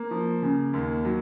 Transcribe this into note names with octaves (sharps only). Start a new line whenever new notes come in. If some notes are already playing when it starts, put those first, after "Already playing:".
Already playing: A#3
F3
C#3
D#2
F#3